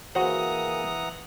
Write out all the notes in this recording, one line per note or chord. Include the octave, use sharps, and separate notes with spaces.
E3 A#3 F#4 G#4 C5 F#5 A#5 D#6